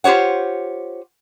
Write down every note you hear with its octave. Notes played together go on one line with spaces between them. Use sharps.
F4 G4 C5 C#5 F#5